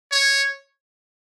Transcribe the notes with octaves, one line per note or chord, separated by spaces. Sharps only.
C#5